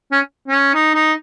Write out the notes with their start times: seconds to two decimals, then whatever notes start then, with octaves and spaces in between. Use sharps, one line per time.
0.11 C#4
0.48 C#4
0.74 D#4
0.94 D#4